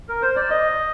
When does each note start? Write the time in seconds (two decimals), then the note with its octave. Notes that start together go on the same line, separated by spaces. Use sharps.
0.08 A#4
0.22 C5
0.36 D5
0.50 D#5